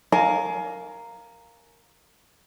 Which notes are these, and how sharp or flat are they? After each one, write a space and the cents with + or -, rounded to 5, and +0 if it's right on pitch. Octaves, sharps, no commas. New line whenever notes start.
A#4 -5 F5 +0 G#5 +30